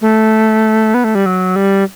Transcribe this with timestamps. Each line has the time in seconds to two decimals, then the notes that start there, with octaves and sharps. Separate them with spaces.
0.01 A3
0.94 B3
1.04 A3
1.15 G3
1.26 F#3
1.56 G3